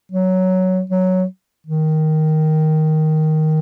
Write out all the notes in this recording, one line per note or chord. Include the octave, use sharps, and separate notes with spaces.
F#3
F#3
D#3